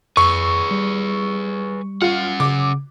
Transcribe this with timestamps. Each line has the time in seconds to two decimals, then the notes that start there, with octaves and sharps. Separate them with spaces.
0.17 F2 G#4 B4 C#6 E6
0.71 G3
2.02 C#4 F4 F#5
2.40 C#3 D6